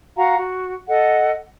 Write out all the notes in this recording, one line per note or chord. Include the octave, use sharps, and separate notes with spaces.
F#4 F5 F#5 A#5
F#4
A4 D#5 F#5